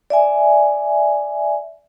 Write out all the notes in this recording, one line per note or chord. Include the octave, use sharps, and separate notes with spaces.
D5 E5 G#5